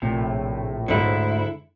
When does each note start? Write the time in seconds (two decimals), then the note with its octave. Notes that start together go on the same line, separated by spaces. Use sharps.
0.02 A#1 A2 C3
0.88 D2 G#2 D3 E4